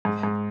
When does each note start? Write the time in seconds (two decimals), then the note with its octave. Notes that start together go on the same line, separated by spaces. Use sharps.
0.05 G#2
0.23 G#2